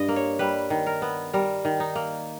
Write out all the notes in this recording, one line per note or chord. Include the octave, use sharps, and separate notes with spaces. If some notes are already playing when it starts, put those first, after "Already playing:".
Already playing: G2 D#5
A#3
C#5
G3 B4
D#3
A#4
B3
G3 A#4
D#3
D#4
A#3